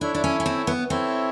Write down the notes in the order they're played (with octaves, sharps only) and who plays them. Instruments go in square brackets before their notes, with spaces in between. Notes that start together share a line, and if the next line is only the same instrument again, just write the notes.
[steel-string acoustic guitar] D4 [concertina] E4 A4 C#5 E5
[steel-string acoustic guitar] D4
C#4
C#4
C4
B3
[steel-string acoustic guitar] C4 [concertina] E4 A4 C#5 E5